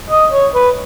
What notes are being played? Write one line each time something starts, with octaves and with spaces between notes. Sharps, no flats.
D#5
C#5
B4